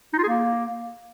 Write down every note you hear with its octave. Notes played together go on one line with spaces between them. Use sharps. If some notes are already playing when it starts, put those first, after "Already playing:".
D#4
F4
G#4
A#3